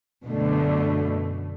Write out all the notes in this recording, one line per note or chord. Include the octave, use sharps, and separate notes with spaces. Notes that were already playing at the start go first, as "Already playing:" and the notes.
F#2 B2 D3 A3